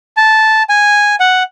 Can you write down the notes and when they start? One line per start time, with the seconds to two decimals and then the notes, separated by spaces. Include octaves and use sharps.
0.17 A5
0.69 G#5
1.20 F#5